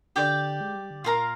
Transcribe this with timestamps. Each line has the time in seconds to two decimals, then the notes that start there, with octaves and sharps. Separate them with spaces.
0.16 D3 G4 D5 G5
0.61 G#3
0.75 G3
0.91 D3
1.04 A#2 F4 A#4 F5 A#5